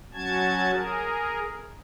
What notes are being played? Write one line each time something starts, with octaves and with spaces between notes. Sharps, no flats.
F#3 C#4 F#4 A5 G#6
G#4 A#4